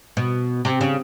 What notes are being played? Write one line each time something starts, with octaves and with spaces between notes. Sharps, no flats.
B2
C3
C#3